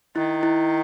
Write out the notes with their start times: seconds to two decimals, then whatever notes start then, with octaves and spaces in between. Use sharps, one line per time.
0.16 D#3 E4
0.43 E4